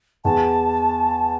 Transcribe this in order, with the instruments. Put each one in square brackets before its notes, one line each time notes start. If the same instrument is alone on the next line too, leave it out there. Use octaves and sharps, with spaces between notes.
[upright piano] E2 [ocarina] A5